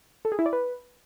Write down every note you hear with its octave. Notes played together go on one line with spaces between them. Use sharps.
A4
G#4
E4
D5
B4